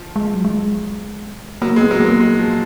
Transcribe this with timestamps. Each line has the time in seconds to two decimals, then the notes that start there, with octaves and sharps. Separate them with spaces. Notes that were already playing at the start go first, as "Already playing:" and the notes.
Already playing: F3
0.16 G#3
0.34 F#3
0.45 G#3
1.62 F#3 A#3
1.76 G#3
1.81 B3
1.91 F#3
2.00 G#3 A#3
2.20 G#3
2.39 F3